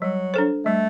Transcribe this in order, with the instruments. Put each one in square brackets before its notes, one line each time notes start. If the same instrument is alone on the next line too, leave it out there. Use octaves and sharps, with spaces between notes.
[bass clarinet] F#3 [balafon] G3
[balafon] D4 A4 C5
[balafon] G3 [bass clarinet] A3